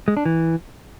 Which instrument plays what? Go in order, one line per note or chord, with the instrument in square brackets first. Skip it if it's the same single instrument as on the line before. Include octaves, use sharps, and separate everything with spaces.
[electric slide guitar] G#3
D4
E3